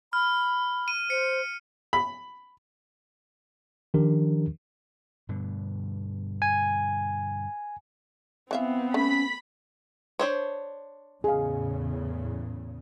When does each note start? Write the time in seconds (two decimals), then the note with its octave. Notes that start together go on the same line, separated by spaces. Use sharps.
0.13 B5 F6
0.88 D#7
1.10 C5 C#7
1.93 B5
3.94 D#3 F3 D4 G4 A#4
5.29 G2 B2 D3
6.42 G#5
8.51 E3 B3 C4 E5 F5
8.94 A3 C#4 B5 B6
10.19 D4 C5 C#5
11.24 E2 A2 C#3 G#4 F5